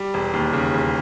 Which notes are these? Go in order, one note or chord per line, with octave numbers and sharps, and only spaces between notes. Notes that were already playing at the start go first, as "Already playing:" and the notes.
Already playing: G3
E1
D#2
C#3
E1